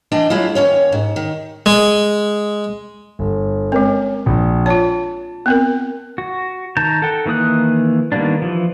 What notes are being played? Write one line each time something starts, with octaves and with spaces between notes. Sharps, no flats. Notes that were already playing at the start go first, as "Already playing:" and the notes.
E3 D4 D#5 G5
F#3 G#3 E4 F4
D#2 C#4 C#5
G#2
D#3
G#3
G1
G#3 C4 C#4 A#4
A#1
F4 C#5 A5
B3 C4 A#4
F#4
D#3 A5 A#5 G6
A4 F#5 G5
D#3 E3 A#3 D#6 F#6
D#3 G3 A#3 B3 D4
E3 F3